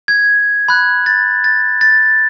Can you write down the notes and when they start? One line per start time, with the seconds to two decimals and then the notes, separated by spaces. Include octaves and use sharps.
0.08 G#6
0.68 B5 F#6 G#6
1.06 A6
1.44 A6
1.81 A6